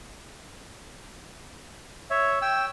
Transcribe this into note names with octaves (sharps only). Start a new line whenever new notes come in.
C#5 E5
G5 E6